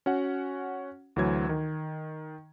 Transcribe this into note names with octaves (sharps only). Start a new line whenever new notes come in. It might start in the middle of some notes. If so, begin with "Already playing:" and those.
C#4 F#4 F#5
D2 E3 F#3 G#6
D#3